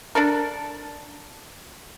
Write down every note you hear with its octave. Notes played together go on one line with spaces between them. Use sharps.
D4 A4 A#4